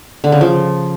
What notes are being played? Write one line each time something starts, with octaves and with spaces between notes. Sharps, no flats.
D3
C#3
F3